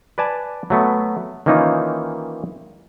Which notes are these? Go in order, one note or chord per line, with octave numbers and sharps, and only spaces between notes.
B4 D5 G#5 A5
F#3 A3 B3
D#3 E3 A#3 C#4 D#4 F4